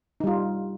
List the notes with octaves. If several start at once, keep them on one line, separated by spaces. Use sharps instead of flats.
G3 D#4 F4